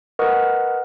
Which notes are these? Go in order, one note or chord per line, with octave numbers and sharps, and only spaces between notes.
A#4 B4 D#5 F#5 C#6 D#6